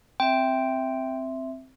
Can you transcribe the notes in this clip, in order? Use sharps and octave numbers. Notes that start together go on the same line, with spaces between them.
C4 E5 G5